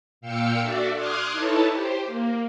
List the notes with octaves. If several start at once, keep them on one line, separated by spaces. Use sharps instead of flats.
A#2 F5 G5 E6 C#7
D4 F#4 A4 D5 E5
C6 D6 D#6 F6 F#6 G#6
D#4 E4 A4 B4 C#5 A5
G4 C5
A#3